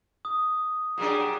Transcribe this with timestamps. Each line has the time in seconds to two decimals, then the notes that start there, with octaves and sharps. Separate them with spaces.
0.25 D#6
0.98 A#2 F#3 D4 G4 G#4